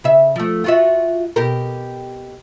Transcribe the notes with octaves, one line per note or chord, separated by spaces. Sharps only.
C#3 E5
F3 A3
F4 F#4 E5
B2 G4 A#4